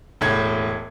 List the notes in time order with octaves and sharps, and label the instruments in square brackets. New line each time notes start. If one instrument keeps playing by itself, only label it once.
[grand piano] E1 A2 G#6